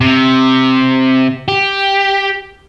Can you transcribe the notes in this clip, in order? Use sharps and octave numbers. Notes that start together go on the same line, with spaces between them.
C3
G4